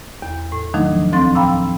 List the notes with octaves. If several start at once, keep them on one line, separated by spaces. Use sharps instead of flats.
E2
A2
D#3 F3 F#3 A3 D4 D#4
D2 A2 F3 C4 C6 A6
F5 G5 A#5 B5 D6 E6
E6